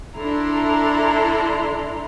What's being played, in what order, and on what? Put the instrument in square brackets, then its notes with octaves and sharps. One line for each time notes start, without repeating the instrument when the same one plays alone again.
[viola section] D4 E4 A4 A#5 C6